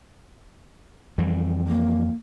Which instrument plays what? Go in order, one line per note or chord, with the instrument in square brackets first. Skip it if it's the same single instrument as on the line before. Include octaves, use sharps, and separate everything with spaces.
[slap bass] F2 E3 G3
[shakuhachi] A#3